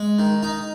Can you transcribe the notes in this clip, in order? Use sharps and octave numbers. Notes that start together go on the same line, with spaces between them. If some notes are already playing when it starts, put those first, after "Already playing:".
Already playing: G#3
D#3
D#4